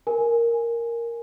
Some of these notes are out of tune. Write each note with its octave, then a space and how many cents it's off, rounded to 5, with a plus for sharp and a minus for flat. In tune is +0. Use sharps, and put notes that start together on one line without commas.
A#4 +0 G#5 +0